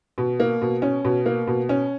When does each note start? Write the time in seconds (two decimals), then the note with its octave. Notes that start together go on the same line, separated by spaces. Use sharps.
0.18 B2
0.40 A#3
0.62 B2
0.82 C#4
1.05 B2
1.26 A#3
1.47 B2
1.69 C#4